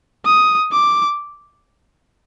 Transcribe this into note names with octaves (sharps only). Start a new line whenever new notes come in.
D#6
D6